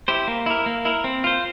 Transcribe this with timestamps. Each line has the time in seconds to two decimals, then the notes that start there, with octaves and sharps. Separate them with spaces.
0.08 E4 G4 C5
0.28 A#3
0.46 E4 A#4
0.66 A#3
0.85 E4 A#4
1.04 C4
1.24 F4 C5